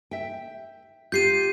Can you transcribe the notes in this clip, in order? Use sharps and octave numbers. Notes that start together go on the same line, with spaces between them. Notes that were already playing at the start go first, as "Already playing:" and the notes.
E5 G5
F4 G4 G6 C7 D#7